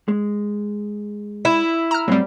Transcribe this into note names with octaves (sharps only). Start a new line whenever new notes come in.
G#3
E4
A#5 F6
A2 F#3 G3 C4